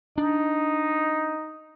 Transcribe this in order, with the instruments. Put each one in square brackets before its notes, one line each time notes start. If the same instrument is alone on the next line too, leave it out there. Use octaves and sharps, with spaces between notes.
[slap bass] D4 [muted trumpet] D#4